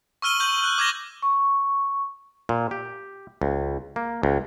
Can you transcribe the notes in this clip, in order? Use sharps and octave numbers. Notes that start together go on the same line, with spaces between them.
C#6 E6 F6 D#7 G7
C#6 G6 F#7
F#6
D6 G#6 A#6 G7
C#6
A#2
G4
C#2
A#3
C#2